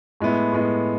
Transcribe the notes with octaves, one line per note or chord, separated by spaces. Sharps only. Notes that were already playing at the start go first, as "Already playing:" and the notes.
A2 G#3 B3 E4
A2 G#3 B3 E4